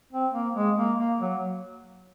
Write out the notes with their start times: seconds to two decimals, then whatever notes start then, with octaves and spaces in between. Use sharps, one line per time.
0.13 C4
0.33 A#3
0.55 G#3
0.77 A#3
0.98 A#3
1.20 F#3